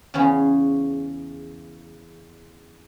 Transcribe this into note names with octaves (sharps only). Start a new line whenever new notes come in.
E2 C#3 C#4 G#4 C#5